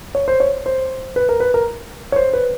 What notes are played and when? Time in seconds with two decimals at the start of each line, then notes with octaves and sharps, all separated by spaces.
0.15 C#5
0.28 C5
0.40 C#5
0.66 C5
1.16 B4
1.29 A#4
1.40 B4
1.54 A#4
2.12 C#5
2.16 C5
2.33 B4